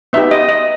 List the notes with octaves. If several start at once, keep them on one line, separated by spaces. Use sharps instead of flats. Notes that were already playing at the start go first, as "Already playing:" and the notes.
B3 D#4 G4 E5
D#5
D#5